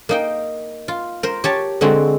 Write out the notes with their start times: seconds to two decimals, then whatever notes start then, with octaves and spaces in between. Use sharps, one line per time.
0.09 A#3 D#4 G5
0.88 F4
1.23 A#4 C5
1.44 G4 C#5 A5
1.81 D3 G#3 C4 F#4